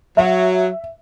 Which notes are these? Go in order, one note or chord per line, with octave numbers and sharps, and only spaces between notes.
F#3 E5